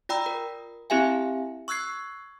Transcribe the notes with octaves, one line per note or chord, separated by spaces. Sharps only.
F4 D5 G5 A#5 B5 E6
A#4
C4 E4 G4 E5 F5 G#5
C#6 E6 F#6 G#6 C7